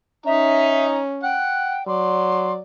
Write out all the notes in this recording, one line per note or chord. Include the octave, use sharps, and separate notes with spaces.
C#4 D#4 E5 A#5
F#5 G5
F#3 D5 C6